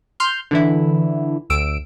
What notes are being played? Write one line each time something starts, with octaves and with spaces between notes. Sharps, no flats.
C6 F6 G6
D3 E3 E4
D2 E6 D7